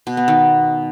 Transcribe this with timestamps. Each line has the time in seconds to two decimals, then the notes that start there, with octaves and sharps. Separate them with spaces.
0.07 B2
0.17 B3
0.28 D#3